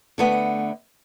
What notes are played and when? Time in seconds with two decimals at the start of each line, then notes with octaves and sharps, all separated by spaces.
0.18 D3 A3 B3